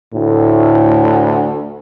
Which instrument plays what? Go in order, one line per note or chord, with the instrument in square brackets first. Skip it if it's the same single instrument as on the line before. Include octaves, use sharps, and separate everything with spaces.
[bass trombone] D2 [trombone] A2